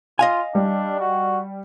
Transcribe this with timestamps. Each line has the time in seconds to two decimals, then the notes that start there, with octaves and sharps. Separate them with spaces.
0.19 F4 D#5 F5 G#5
0.55 G3 D4
1.01 F#4